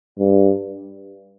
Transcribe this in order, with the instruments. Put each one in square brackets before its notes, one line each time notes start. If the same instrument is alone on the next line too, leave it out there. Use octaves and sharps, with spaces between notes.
[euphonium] G2